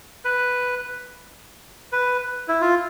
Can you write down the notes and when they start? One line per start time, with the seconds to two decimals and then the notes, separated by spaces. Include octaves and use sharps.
0.25 B4
1.92 B4
2.48 E4
2.61 F4